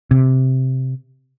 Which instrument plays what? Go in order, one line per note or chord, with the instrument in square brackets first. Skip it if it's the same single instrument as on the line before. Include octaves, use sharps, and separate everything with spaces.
[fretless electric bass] C3